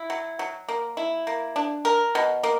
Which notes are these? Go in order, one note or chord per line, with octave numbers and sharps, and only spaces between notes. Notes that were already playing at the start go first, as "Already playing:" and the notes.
Already playing: E4
F#3
F#3
A#3
E4
A#3
D4
A#4
B2
A#3